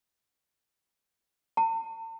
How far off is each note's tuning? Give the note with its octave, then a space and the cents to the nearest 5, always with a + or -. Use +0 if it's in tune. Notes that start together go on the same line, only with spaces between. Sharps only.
A5 +45